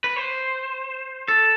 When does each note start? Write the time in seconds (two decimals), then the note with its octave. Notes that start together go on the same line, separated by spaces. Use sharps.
0.04 B4
0.16 C5
1.28 A4